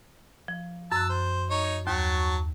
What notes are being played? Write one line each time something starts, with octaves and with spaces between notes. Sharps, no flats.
F3
F#2 A5 E6 F#6
C5
D#4 C#5
D#2 F#3 A5 C#6